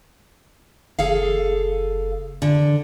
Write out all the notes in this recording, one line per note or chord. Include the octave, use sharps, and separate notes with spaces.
F#1 G#4 A4 F5
D3